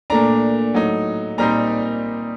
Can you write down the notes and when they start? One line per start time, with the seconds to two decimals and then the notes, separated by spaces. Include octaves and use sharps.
0.10 A#2 A3 D4 A#5
0.74 A2 F#3 A3 D#4
1.38 A#2 G3 C4 D#4 A#5